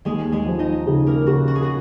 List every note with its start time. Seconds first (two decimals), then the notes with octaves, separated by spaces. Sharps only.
0.05 D#2 G#3 G#4
0.32 G#3 G#4
0.46 F3
0.59 D#4 D#5
0.87 C#3
1.07 A#3 A#4
1.27 C#3 F#4
1.48 F#4
1.55 G#4
1.63 F#4